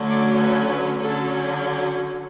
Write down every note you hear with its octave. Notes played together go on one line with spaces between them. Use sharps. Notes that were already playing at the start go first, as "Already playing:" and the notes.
Already playing: D3 F#3 A3 C#4
D5
B4
B4
D3 F#3 C#4 A4